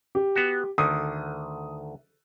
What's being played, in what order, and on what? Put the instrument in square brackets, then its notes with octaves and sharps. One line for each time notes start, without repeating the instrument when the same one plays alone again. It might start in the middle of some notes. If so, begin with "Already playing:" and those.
[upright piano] G4
[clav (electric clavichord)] B3 F#4
[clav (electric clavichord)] D2 D3 D#3 [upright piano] D#6